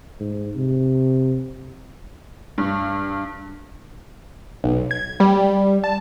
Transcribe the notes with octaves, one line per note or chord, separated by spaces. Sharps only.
G#2
C3
G2
B1
G#6
G3
A5